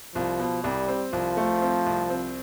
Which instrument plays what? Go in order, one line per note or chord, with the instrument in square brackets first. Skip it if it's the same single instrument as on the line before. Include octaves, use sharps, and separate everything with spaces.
[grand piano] C2 [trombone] F3
[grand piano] B2
[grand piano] C2 [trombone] G3
[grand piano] C4
[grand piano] C2 [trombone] F3
[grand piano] A3
C4
C2
C4